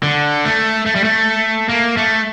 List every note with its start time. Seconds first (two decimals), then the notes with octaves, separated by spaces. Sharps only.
0.03 D3
0.45 A3
0.86 A3
0.96 G3
1.04 A3
1.69 A#3
1.97 A3